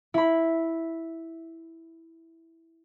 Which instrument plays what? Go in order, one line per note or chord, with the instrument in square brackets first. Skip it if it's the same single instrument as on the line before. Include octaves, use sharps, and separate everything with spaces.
[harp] E4 B5